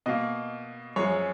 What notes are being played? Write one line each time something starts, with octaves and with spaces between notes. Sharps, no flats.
B2 A#3 D#5
F#2 F3 G#3 C#5